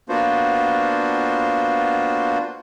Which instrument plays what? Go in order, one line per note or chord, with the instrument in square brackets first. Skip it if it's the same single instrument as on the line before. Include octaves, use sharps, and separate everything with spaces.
[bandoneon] A#3 B3 D4 F4 F#4 C5